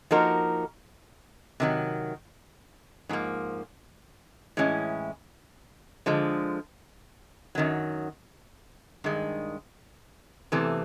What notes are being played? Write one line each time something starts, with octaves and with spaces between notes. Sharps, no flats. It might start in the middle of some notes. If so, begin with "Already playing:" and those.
F3 A#3 D#4 F#4 A#4
C3 D#3 F#3
G#2 F3 A#3
A2 E3 G#3 C#4 E4
D3 F3 G#3
F#2 D#3 F#3
G2 D#3 G#3
E2 C3 E3 A3